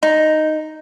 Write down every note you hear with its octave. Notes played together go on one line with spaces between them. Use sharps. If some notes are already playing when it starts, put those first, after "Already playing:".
D#4